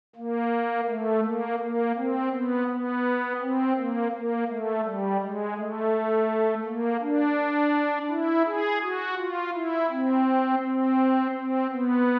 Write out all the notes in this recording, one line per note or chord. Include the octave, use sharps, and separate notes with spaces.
A#3
A3
A#3
A#3
C4
B3
B3
C4
A#3
A#3
A3
G3
G#3
A3
A#3
D4
E4
G#4
F#4
F4
E4
C4
C4
C4
B3